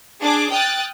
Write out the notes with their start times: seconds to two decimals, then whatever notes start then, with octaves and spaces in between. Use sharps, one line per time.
0.21 D4 G#4 D6
0.52 G5 D#6 F6 F#6 A6